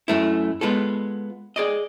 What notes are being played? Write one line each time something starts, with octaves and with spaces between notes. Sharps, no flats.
F#2 A3 E4
G#3 B3 F4 A4
G#4 D5 D#5